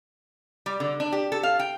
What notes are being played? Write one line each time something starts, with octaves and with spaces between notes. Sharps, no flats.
G3
D3
D4
G4
A4
F5
G5